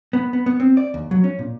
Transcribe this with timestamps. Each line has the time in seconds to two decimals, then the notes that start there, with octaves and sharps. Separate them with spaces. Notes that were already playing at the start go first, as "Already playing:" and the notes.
0.13 B3
0.33 B3
0.46 B3
0.60 C4
0.77 D5
0.94 D#2
1.11 F#3
1.24 C#4
1.39 A#2